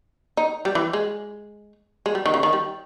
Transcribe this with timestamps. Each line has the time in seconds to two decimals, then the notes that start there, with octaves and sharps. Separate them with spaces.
0.37 D#4
0.65 G3
0.75 E3
0.93 G#3
2.06 G#3
2.15 G3
2.26 D#3
2.34 C#3
2.43 D#3
2.53 G3